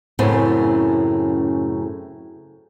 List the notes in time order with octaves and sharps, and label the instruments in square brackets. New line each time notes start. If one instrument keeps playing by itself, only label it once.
[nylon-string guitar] F#2 A2 C#3 B3 C4 C5